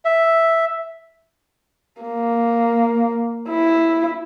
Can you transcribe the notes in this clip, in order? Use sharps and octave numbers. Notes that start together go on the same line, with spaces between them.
E5
A#3
E4